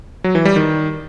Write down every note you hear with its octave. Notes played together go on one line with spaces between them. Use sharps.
F#3
E3
G3
D#3